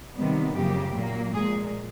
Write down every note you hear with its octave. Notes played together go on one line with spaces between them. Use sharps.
C3 D#3 G3 B3
F#2 C#3 F3 A#3 G4
A#2 F#3 A#3
A#2 F3 G#3 G#4